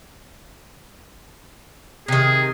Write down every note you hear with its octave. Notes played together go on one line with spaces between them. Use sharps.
C3 D#3 G#4